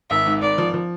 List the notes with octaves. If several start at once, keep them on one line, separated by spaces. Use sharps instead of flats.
G#1 E5
G#2
G#1 D5
F3
F3